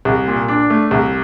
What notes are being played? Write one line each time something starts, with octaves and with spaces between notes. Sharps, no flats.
C2
A#2
D4
A3
C2